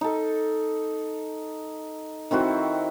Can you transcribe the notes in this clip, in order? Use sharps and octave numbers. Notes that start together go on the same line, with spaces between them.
D#4 A4
D#3 C4 E4 F#4